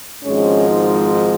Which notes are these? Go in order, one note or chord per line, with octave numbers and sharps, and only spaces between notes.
G#1 G#2 F3 G#3 C#4
D#4